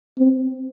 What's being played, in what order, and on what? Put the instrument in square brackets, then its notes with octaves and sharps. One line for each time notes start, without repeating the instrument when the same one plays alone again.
[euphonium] C4